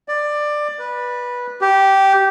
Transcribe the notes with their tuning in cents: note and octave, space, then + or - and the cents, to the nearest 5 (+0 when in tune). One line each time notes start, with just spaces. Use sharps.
D5 +15
B4 -15
G4 -10